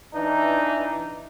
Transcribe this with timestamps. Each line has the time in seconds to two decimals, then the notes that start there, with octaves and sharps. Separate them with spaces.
0.14 E3 D4 D#4